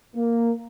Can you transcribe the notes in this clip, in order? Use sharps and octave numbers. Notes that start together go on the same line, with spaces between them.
A#3